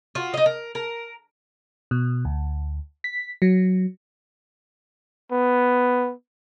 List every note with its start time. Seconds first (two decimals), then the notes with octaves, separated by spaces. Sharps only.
0.15 F4 F#4
0.34 D#4 D#5
0.46 A#4
0.75 A#4
1.91 B2
2.25 D2
3.04 B6
3.42 F#3
5.32 B3